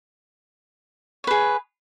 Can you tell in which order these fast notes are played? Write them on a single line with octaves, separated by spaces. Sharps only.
C#5 B4 G#4